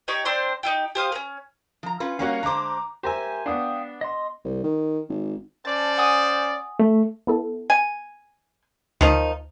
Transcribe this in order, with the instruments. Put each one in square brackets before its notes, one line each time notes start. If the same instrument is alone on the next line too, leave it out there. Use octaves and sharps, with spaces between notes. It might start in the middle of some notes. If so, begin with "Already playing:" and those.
[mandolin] D#4 G4 C#5 G5
C4 D4 C5 C6
D#4 E4 G4
G4 C5 F5 D#6
A#3 C#4
[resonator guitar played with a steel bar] F3 A#5
C#4 F4 B4
[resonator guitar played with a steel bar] G3 A#3 C#4 [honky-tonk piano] F#4 C#5 F5
[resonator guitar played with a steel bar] D3 G#3 C5 [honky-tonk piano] A#5 D6
[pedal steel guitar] G4 A#4 E5 [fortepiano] C5 G#5
[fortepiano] B3 D4 [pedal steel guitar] F5 G5 D#6
[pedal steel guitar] D#5 C6
[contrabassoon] C2
D#3
G#1
[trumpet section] C#4 C5 D5 [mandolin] A5
[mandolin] F#5 G#5 D#6
[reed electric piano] A3
[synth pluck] B3 E4 A4
[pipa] G#5
[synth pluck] D2 [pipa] D#3 F3 D#4